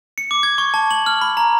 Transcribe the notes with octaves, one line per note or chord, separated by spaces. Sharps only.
C#7
D6
G#6
C#6
A5
F#7
F6
B5
A#5